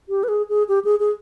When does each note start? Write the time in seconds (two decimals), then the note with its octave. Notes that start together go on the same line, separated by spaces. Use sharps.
0.09 G4
0.24 B4
0.28 G#4
0.49 G#4
0.69 G4
0.85 G#4
1.00 G#4